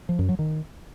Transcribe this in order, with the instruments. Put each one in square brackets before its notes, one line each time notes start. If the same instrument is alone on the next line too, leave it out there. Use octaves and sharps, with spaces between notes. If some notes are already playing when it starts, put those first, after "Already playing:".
[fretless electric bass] F3
F#2
F#3
D#3